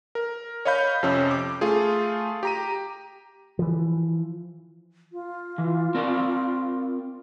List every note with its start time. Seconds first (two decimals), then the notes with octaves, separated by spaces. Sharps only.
0.15 A#4
0.65 C#5 D#5 F5 B5 G6
1.03 F2 C3 F3 C#4 E6
1.31 D6
1.61 A3 F4 G#4
2.43 G4 A#5 D#7
3.59 E3 F3
5.12 F4
5.58 E3
5.95 C4 A#4 D5